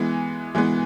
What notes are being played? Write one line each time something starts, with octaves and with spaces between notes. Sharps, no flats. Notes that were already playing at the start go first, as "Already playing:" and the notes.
Already playing: E3 G#3 B3
E3 G#3 B3